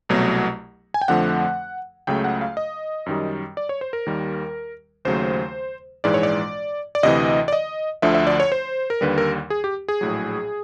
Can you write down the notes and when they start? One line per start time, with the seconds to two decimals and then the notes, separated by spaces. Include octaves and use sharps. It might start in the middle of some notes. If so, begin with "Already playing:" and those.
0.09 C2 B2 F#3 A3
0.94 G#5
1.01 G5
1.08 F2 D3 F3 A3 F#5
2.07 C#2 C#3 F#3 A3 G5
2.24 F#5
2.41 F5
2.57 D#5
3.06 F#2 D#3 G3
3.57 D5
3.69 C#5
3.81 C5
3.93 A#4
4.06 D#2 D#3 G3
5.05 D#2 C#3 F#3 A3 C5
6.04 A#1 G#2 E3 G#3 D5
6.14 C#5
6.23 D5
6.95 D5
7.03 D2 C3 E3 D#5
7.48 D5
7.53 D#5
8.02 D2 D3 F3 E5
8.15 E5
8.27 D5
8.40 C#5
8.52 C5
8.90 A#4
9.01 D#2 D3 G3 B4
9.18 A#4
9.50 G#4
9.64 G4
9.88 G#4
10.01 A#1 A2 F#3